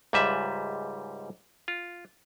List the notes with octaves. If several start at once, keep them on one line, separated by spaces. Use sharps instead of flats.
C#2 G#2 G3 B4 E5
F4